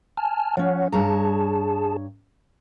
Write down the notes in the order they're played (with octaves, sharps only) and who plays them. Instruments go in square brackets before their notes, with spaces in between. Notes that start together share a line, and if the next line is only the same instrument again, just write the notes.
[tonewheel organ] G#5 A5 F6
[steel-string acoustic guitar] F3 C#4 [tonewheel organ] C#5 F#5
[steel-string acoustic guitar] G2 C#5 A#5 [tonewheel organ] G#4 A5